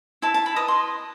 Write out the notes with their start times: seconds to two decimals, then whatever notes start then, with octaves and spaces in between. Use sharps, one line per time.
0.22 E4 A5
0.34 A5
0.46 B5
0.56 B4 D#5 D#6
0.68 C6